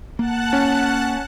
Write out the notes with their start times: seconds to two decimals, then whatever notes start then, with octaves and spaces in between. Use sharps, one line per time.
0.19 A#3 F#5 A5 F#6
0.53 C#4